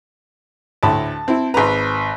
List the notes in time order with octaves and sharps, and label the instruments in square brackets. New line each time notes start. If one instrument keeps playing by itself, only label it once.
[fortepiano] D2 A2 B5 [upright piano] A5
[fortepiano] C4 E4
[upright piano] G#1 B4 [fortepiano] A#5 C6